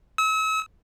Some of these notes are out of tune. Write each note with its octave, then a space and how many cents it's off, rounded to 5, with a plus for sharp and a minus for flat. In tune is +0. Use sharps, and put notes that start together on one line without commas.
E6 -40